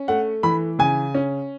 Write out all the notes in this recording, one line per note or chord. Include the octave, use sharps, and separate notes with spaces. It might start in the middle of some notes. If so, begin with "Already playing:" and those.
Already playing: C#4
A3 F#5
E3 B5
C#3 G#5
C#4